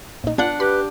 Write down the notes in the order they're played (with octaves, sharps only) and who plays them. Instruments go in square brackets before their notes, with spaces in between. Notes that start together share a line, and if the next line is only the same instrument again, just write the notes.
[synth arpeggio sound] A#1 D#4
[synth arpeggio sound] B3 F4 G6 [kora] D4 F#5
[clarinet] G4 [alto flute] B4 [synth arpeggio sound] B5